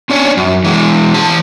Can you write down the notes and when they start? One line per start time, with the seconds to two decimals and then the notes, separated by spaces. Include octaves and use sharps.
0.10 C#4 D4 C#5
0.37 F#2
0.64 E3 G#3
1.14 E3 A5